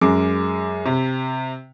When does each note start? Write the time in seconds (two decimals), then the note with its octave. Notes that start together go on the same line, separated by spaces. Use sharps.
0.01 F#2 G#3 D6
0.86 C3